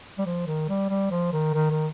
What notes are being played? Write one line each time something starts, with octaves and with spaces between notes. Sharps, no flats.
G3
F3
D#3
G3
G3
F3
D#3
D#3
D#3